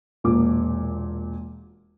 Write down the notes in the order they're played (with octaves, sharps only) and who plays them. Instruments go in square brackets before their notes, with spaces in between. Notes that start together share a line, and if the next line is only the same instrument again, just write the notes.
[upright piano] E1 A#2 D6